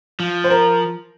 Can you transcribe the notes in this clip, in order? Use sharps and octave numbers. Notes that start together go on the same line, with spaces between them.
F3
C5
A#4